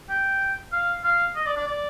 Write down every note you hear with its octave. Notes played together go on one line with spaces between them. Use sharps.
G5
F5
F5
D#5
D5
D5
D5